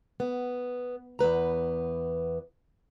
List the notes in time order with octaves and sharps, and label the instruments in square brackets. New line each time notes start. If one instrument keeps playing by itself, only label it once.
[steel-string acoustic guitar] B3
E2 B3 B4 A#5